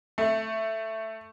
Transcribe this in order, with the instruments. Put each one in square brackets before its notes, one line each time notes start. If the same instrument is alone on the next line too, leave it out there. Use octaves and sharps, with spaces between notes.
[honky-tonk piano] A3